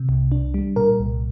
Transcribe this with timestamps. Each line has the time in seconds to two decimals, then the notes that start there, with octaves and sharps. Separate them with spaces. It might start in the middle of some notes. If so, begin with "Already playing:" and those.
Already playing: C3
0.09 C2
0.32 D4
0.54 G3
0.76 A#2 A#4
1.00 C2